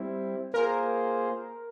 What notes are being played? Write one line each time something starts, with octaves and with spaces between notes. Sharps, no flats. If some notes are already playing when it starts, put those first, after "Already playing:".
Already playing: G3 C4 E4
A#3 F4 G#4 A#4 C5